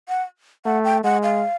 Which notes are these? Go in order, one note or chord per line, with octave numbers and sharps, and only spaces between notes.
F#5
A3 F#5
G5
G#3 F#5
F5